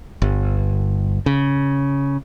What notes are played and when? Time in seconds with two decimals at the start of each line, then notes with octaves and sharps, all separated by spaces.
0.22 G1
1.26 C#3